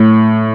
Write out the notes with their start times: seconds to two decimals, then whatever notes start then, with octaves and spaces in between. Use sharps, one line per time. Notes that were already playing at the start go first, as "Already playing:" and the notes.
Already playing: A2